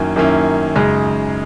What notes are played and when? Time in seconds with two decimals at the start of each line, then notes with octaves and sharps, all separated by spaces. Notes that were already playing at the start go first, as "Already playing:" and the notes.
Already playing: F#2 D#3 A#3 C#4 E4
0.16 F#2 D#3 A#3 C#4 E4
0.75 F#2 C#3 G#3 D#4 G#4